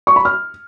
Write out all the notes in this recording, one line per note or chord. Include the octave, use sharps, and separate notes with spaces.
C#6
B5
F6